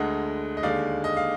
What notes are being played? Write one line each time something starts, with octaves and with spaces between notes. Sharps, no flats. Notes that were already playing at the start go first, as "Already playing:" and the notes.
Already playing: D2 D3 G#3 D#5 F#5
D#5
D#2 D3 G#3 D5 F5
D#5
F5